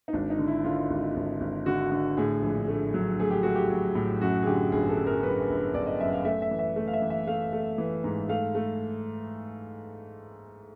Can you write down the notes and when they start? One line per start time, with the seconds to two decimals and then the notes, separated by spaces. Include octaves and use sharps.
0.08 D#4
0.13 G#1 D4
0.30 D#4
0.39 D3
0.47 E4
0.64 D3 F4
0.90 G#1
1.16 G#1
1.40 G#1
1.66 D3 F#4
1.92 D3
2.17 A2 G#4
2.42 A#1
2.68 A3
2.94 F#3
3.20 A3 G#4
3.31 G4
3.43 A3 F#4
3.56 G4
3.70 F#3
3.95 A2
4.21 F#2 F#4
4.42 G#4
4.46 D3 G4
4.72 G1 G#4
4.89 A4
4.98 F#2
5.06 A#4
5.23 F#2 B4
5.49 G1
5.74 G1 D5
5.87 D#5
6.00 F#2 E5
6.12 F5
6.25 A3 E5
6.42 E5
6.51 E3
6.59 E5
6.76 A3
6.87 F5
6.93 E5
7.02 E3
7.10 E5
7.27 A3 F5
7.53 A3
7.78 E3
8.04 G#2
8.29 A3 F5
8.55 A3